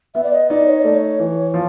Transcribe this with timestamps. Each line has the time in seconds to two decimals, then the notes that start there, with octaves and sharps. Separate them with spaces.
0.15 B3 E5
0.24 D5
0.32 D#5
0.49 D#4 D5
0.67 C#5
0.80 A3 D5
0.93 C#5
1.19 E3
1.54 F3